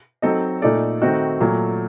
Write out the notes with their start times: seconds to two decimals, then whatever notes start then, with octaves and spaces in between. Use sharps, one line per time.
0.22 F#3 C4 D#4 A4 D#5
0.62 A#2 A3 D#4 A4 D5
1.02 D#3 A3 C4 D#4 F#4
1.40 A#2 F#3 A3